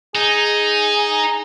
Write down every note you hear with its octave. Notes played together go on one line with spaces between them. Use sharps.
D#4 G#4